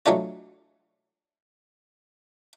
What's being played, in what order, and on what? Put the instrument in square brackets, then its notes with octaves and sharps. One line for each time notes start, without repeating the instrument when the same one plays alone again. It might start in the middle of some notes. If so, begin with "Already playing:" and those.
[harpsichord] F#3 G#3 A3 D4 F4